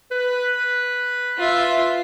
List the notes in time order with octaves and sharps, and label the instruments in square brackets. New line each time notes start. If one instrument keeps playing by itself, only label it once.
[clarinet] B4
[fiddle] F4 E5